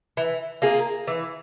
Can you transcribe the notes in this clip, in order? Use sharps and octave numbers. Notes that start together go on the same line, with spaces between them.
E3
A#3 F4 G#4
E3